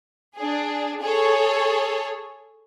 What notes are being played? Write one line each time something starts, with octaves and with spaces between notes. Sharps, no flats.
D4 G#4
G#4 A4 C#5